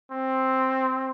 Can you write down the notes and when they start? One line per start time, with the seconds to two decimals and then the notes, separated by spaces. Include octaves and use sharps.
0.11 C4